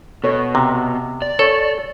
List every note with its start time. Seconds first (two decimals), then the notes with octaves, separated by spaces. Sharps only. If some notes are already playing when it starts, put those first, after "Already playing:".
0.24 B2 A4 C#5
0.55 C3 A#5
1.22 D5
1.39 A4 C#5